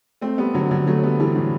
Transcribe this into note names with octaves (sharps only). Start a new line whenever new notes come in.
A3 C4
G3 B3
D3 F#3
D3 F#3
F#3 A3
G3 B3
E3 G3
A2